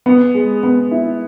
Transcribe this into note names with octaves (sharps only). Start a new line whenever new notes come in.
B3
G#3
B3
E4